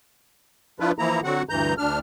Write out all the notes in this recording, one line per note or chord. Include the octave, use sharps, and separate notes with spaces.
F3 D4 E4 F4 B4
E3 F3 A#3 E4 A#5
D3 F#3 C4 F#4 F#5
D2 G2 E3 A#5 G6
D2 D4 F6